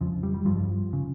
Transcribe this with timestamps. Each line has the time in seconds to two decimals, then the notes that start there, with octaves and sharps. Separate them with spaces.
0.01 F2 C#3 F3
0.23 G3
0.34 G3
0.45 G2 F3
0.93 C#3